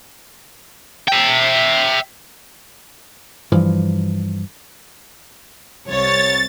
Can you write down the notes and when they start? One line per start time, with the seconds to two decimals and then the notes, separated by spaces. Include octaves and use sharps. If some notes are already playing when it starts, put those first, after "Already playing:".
1.08 E5 G5
3.52 G2 E3 F3
5.87 C2 C#5 A6